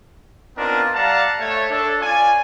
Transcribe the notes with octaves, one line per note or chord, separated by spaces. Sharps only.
B3 C4 D4 D#4 F4 A#4
G3 D5 F5 F#5 A5 A#5
A3 C#5
D4 A4
C#4 F4 D5 G#5